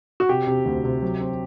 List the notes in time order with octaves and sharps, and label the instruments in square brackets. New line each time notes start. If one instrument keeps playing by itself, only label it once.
[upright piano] F#4
[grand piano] C3 [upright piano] G4
[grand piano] C3
D2
C3
F#3
C4